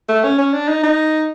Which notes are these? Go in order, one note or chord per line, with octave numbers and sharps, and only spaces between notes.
A3
C#4
C#4
D4
D#4
D#4